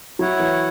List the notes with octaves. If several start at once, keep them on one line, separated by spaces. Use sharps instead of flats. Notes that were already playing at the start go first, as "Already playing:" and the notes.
F#3 E4 C#5 F#5
E3